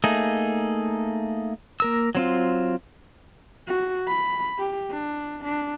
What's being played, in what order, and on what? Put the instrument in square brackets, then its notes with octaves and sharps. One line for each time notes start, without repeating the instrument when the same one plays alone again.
[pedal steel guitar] A3 A#3 D#4 G#4
A#3 A#4 E6
F#3 C4 F4
[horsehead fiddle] F#4
B5
G4
D4
D4